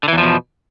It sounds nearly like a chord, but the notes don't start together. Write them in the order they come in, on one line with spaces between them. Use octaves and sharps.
D3 E3 E2 F3 B2